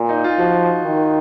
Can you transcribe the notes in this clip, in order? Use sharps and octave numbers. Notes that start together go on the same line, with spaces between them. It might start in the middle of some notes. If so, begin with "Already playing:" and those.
Already playing: A#2
D#4
F4
F3 F#4
D#3